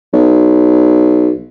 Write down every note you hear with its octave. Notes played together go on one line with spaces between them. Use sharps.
B1